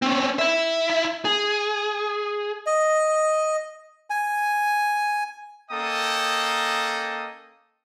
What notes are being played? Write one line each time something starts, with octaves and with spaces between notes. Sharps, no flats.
C4 C#4
E4 E5
G#4
D#5
G#5
A#3 C#4 A4 D#5 G5 D#6